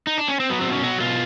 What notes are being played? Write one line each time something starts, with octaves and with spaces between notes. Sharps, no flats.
D#4
D4
C#4
C4
F#3 B3
C4
B2
C#4
F#3 F#4
B2 F4